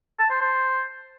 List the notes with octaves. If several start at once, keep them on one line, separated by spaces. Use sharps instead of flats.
A5
C5
C5